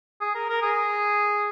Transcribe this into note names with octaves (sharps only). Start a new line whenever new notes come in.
G#4
A#4
A#4
G#4